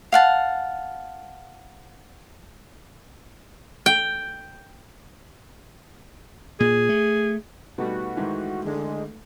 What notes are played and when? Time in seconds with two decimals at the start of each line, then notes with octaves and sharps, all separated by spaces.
0.12 F5 F#5 A5
3.86 G5
6.60 A#2 G#4
6.89 A3
7.78 B2 G3 A3 D#4 F#4 B4
8.16 G#2 D#3 E3
8.65 D3 G#3